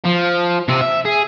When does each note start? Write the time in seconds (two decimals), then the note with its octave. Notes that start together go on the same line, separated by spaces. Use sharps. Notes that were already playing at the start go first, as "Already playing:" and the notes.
0.05 F3
0.68 C3 C4
0.81 E5
1.05 G#4